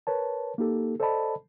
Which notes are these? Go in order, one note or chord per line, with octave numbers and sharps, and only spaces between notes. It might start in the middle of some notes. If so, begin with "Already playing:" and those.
A#4 B4 C#5 A5
A#3 D#4 G4 A4
A4 C5 D5 D#5 A5 B5